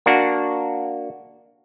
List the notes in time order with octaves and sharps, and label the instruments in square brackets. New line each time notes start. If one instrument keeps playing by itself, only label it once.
[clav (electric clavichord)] A#3 D4 F#4